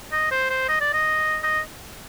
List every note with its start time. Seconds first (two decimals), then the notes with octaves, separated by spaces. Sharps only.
0.12 D#5
0.31 C5
0.50 C5
0.68 D#5
0.81 D5
0.94 D#5
1.43 D#5